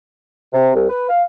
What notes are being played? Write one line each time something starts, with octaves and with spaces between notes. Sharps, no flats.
C3
C2
B4
F5